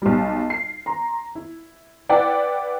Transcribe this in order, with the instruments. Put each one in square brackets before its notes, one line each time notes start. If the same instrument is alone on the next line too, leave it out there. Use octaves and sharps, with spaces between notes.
[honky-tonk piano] B1 G3
C7
A#5 C6
E4
E4 B4 D5 F#5 G5